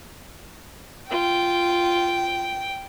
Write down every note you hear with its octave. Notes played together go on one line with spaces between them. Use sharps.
F4 G5